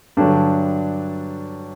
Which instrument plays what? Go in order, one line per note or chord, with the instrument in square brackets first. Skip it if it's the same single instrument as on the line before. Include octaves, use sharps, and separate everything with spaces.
[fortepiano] G2 D3 F#3 D4